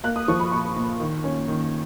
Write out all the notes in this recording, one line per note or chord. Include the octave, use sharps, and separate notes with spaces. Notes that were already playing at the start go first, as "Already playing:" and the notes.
A#3 F#6
D#6
F3 C#6
B5
A#2 C#6
A#2
D#3
C#4
D#3